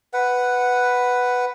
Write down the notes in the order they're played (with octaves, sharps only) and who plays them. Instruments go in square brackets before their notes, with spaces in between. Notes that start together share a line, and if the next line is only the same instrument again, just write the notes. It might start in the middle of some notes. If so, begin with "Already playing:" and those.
[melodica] B4 F#5